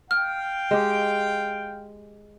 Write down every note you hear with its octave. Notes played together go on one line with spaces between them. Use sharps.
F5 G5 F6
G#3 G4